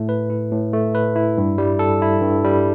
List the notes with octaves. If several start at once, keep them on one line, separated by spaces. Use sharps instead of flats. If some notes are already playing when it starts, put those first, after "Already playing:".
Already playing: A2 A3
B4
E4
A2
A3
B4
E4
G2
G3
A4
E4
G2
G3